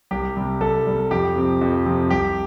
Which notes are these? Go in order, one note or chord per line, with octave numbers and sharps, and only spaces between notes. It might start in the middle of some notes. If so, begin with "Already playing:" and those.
C2 G4
C3 G3
C2 A4
C3 G3
F2 G4
C3 F3 C4
F2
C3 F3 C4
C2 G4